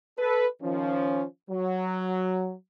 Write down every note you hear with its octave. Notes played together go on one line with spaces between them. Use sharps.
A4 B4
D#3 F3 C#4
F#3